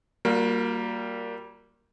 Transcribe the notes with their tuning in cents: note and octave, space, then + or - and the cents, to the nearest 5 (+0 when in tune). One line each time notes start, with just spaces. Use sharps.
G3 -15 A#3 +0 F#4 -45